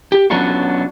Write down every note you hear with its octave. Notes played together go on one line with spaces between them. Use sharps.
G4
F#3 B3 C#4 D4 F4 F#4